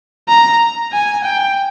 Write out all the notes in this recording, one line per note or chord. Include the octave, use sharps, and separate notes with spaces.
A#5
G#5
G5